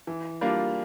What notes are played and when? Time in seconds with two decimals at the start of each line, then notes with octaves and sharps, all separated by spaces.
0.07 E3
0.41 G3 A#3 D4 F4